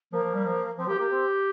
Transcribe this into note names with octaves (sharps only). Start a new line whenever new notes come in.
F3 A#3
F3
G3
F3
F3 C4
A#3 G4
C4
A#3 G4
C4